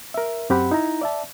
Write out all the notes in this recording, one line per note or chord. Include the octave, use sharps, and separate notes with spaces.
A#4 E5
F#2 C4 G4 F#5 B5
D#4 E4 A#5
D5 E5 A5